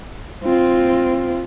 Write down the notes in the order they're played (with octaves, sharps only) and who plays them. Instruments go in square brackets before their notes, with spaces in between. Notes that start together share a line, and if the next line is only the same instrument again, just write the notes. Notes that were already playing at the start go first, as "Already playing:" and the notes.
[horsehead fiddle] C4 F4